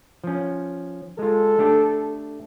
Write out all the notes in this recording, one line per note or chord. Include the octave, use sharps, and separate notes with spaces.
F3 C#4
G#3 F4 A4
A3 D4 G4